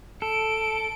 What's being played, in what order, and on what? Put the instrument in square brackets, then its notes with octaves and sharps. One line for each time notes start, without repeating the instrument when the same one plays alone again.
[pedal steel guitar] A4 [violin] D7